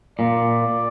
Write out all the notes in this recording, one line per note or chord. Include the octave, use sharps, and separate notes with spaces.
A#2 D5